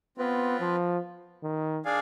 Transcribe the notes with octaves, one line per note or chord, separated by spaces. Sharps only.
B3 C4 F4 B4
F3
D#3
D4 G#4 D5 F5 G#5